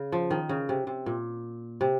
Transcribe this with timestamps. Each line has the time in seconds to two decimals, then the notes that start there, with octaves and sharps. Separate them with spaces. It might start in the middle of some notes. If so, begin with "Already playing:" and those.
Already playing: C#3
0.12 F3
0.31 D#3
0.49 C#3
0.69 C3
0.87 C3
1.06 A#2
1.81 C3